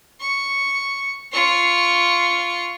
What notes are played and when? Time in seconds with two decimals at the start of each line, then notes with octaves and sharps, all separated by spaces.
0.21 C#6
1.32 F4 C#6